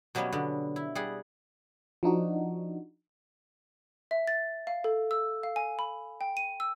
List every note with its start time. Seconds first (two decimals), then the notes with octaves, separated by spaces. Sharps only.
0.15 B2 F#3 G3 A#3 B3 C#4
0.32 D3 B3
0.76 E4
0.95 G3 G#4 F#5
2.03 F3 D4 D#4 F#4
4.11 E5
4.27 A6
4.67 F5
4.84 A4
5.11 E6
5.43 F5
5.56 G#5
5.79 B5
6.21 G5
6.37 D#7
6.60 E6